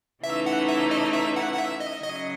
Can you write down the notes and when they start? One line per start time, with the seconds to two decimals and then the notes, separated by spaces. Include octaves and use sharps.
0.24 C#3 E3 A3 D#4 E5
0.46 F#5
0.68 E5
0.91 D#5
1.13 E5
1.36 F#5
1.54 F#5
1.58 E5
1.80 D#5
2.03 C#3 F#3 D#5